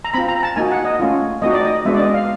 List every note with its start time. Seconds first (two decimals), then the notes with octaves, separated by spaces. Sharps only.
0.04 A#5
0.14 C4 F4 B5
0.28 A#5
0.43 A5
0.56 A#3 D#4 F#4 G#5
0.71 F#5
0.85 D#5
1.00 A3 C#4 F4
1.42 A3 C4 D#4 F#4 D#5
1.53 D5
1.65 D#5
1.85 G#3 B3 D4 F#4 E5
1.94 D5
2.00 D#5
2.14 F5